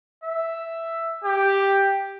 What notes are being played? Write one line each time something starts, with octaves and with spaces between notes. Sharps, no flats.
E5
G4